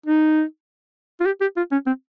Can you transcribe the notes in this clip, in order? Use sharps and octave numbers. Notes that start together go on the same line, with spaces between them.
D#4
F4
G4
G4
F4
C#4
C4